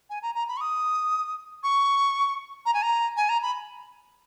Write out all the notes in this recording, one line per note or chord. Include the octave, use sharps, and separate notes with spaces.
G#5
A#5
A#5
B5
C#6
D#6
C#6
A#5
G#5
A#5
G#5
A#5
B5